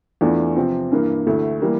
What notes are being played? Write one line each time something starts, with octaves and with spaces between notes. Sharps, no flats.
E2 E3 A3 D4 F4
C3 F3 C4
G2 E3 A#3
D2 D3 A3 E4
E3 G3 A#3